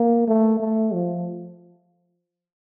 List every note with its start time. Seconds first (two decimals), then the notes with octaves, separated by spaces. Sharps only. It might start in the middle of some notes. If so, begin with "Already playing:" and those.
Already playing: A#3
0.28 A3
0.60 A3
0.93 F3